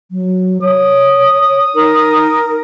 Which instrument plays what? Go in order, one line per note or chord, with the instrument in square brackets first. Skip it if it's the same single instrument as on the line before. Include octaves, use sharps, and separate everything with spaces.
[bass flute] F#3
[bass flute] C#5 [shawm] D#6
[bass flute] D#4 [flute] A#4